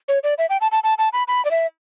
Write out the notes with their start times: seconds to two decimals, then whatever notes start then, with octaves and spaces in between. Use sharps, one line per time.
0.08 C#5
0.24 D5
0.38 E5
0.50 G5
0.61 A5
0.72 A5
0.84 A5
0.98 A5
1.13 B5
1.28 B5
1.45 D5
1.51 E5